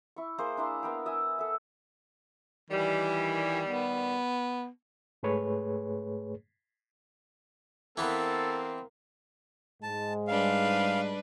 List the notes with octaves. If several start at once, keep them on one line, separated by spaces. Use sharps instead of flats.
E4 C#6
A#3 G#4 C5 D#5
D4 E4 A#5 C6
B3 A#4 G5
D#5 E5 G#5
A4 E5
D#3 E3 G3
B3
G#2 A3 G#4 B4 C#5
E3 B3 C4 A4 A#4 F5
G#2 G#3 A5
G3 D4 B4 F5